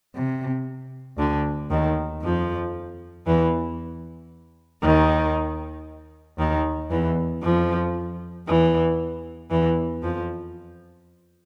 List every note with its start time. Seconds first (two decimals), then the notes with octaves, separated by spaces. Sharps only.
0.14 C3
1.17 D2 D3
1.69 D#2 D#3
2.21 F2 F3
3.25 E2 E3
4.81 D#2 D#3
6.37 D#2 D#3
6.89 E2 E3
7.42 F2 F3
8.45 E2 E3
9.50 E2 E3
10.02 F2 F3